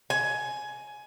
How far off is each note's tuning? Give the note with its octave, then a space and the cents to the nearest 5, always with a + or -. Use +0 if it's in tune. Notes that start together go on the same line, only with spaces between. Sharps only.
G#5 +15